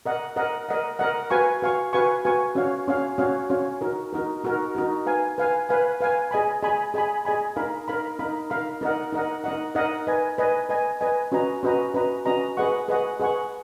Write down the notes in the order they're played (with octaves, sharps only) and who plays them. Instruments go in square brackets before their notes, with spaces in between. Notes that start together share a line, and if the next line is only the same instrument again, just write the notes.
[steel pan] A#4 D#5 F#5
A#4 D#5 F#5
A#4 D#5 F#5
A#4 D#5 F#5
F#4 B4 F5 G#5 C#6
F#4 B4 F5 G#5 C#6
F#4 B4 F5 G#5 C#6
F#4 B4 F5 G#5 C#6
C#4 F#4 C#5 F5
C#4 F#4 C#5 F5
C#4 F#4 C#5 F5
C#4 F#4 C#5 F5
D#4 F#4 A#4
D#4 F#4 A#4
D#4 F#4 A#4
D#4 F#4 A#4
B4 F5 G#5
B4 F5 G#5
B4 F5 G#5
B4 F5 G#5
G#4 D#5 G#5 B5
G#4 D#5 G#5 B5
G#4 D#5 G#5 B5
G#4 D#5 G#5 B5
D#4 A#4 F5 B5
D#4 A#4 F5 B5
D#4 A#4 F5 B5
D#4 A#4 F5 B5
D#4 A#4 D#5 F#5
D#4 A#4 D#5 F#5
D#4 A#4 D#5 F#5
D#4 A#4 D#5 F#5
B4 D#5 G#5
B4 D#5 G#5
B4 D#5 G#5
B4 D#5 G#5
C#4 F#4 B4 D#5 A#5
C#4 F#4 B4 D#5 A#5
C#4 F#4 B4 D#5 A#5
C#4 F#4 B4 D#5 A#5
G#4 B4 D#5 F#5 C#6
G#4 B4 D#5 F#5 C#6
G#4 B4 D#5 F#5 C#6